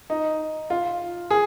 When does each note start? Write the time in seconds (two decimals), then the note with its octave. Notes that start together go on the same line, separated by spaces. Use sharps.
0.10 D#4
0.70 F4
1.30 G#4